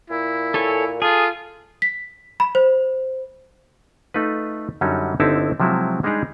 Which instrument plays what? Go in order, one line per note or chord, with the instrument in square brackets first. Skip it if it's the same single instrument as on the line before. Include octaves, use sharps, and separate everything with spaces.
[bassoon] A#2 [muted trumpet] E4
[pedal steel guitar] A4 C#5 G#5
[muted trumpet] F4 [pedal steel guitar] G#4 [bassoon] A4
[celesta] B6
B5
C5
[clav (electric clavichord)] A3 D#4 F4 B4
F#2 D3 F#3 G3 C#4 D#4
G1 D3 C4 D#4 E4 A5
C3 F3 F#3 G#3 E4 F#4
G3 G#3 D4 D#4 G4 G#4